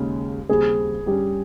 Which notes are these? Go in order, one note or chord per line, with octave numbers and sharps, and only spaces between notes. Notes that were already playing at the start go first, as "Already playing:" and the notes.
Already playing: D#2 C#3 G#3 C#4
D#2 C#3 G3 C4 G#4
G2 G3 C#4 G4